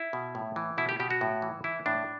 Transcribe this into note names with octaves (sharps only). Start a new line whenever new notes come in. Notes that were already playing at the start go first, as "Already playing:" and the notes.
Already playing: E4
B2
A2
E3
B2 E4
G4
B2 G4
F#4
A2
E3
E3 E4
A2 D4